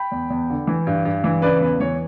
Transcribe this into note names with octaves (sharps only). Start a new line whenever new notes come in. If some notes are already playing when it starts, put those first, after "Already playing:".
Already playing: G5 B5
E2
E2
D3
E3
G2
G2
E3
C#3 B4 D5
E2 B4
E3 C#5